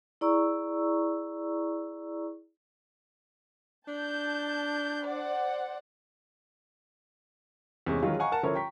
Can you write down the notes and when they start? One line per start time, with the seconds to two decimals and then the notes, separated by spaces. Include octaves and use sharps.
0.21 E4 G#4 D5 A#5 C#6 E6
3.88 D4 A5 G6
5.04 C5 D5 F#5
7.86 E2 C3 G#3 C#4
8.02 D#3 E3 F#3 G#3 C#4 F4
8.19 D#5 F5 F#5 G#5 A#5 C#6
8.32 A#4 F#5 A5
8.43 D3 F3 C#4 E4 A#4 C#5
8.55 G5 A#5 C#6 B6